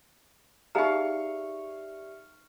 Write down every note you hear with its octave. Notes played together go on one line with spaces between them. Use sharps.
D#4 G4 G#4 D5 E5 F5 A#5 C#6